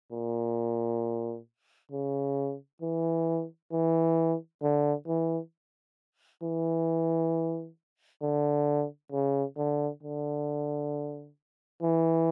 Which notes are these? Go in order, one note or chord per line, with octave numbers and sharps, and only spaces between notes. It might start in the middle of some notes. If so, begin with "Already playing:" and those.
A#2
C#3
E3
E3
D3
E3
E3
D3
C#3
D3
D3
E3